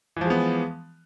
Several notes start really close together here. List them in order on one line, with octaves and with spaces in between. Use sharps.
E3 F3 G#3 B3